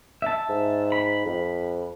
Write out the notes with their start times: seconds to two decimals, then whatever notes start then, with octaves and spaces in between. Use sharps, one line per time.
0.22 E5 A5
0.49 G#2
0.92 B5
1.25 F2